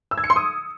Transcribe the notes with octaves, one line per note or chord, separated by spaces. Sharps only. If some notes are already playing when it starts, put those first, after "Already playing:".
E6
G#6
C#7
C6
D#6